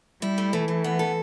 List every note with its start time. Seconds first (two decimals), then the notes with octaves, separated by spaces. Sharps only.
0.22 G3 E4
0.38 A3
0.53 E3 A3
0.68 A3
0.84 B3
0.99 A4